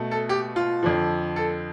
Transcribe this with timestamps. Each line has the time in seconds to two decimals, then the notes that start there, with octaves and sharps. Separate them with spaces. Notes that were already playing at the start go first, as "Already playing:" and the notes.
Already playing: B2 A3
0.11 A4
0.29 G4
0.56 F4
0.83 F2 D3 F3
1.36 A4